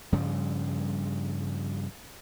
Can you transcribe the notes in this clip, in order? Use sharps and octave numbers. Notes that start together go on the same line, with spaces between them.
G2 C#3 F3 G3